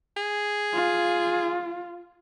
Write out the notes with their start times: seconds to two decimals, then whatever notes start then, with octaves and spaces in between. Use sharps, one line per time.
0.17 G#4
0.74 F4